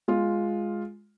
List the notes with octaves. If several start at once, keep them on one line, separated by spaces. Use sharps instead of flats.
G#3 F4